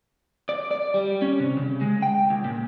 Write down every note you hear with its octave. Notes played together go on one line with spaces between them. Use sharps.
D5
D5
G3
C#4
C3
C#3
G#3
G5
C#2
A#2